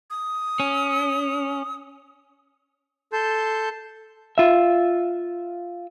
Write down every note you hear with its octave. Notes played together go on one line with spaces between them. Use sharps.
D#6
C#4
A4 A5 C6 G6
F4 E5